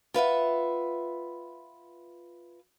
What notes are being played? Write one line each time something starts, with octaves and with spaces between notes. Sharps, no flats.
F4 B4 E5 F#5